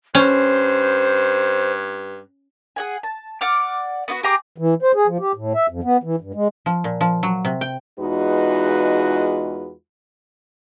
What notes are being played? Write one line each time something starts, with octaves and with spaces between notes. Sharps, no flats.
G2 C#4 C5
G#4 F#5 G#5
A5
D5 F#5 D6 F6
B3 F4 F#4
G4 G#4 A#5 D6
E3
C5
G#4
F3
G4
A2
E5
F2
B3
E3
G2
G#3
F3
A#2
F3
F#3
C3
G5
E2 G#3 D#4 F4 F#4 B4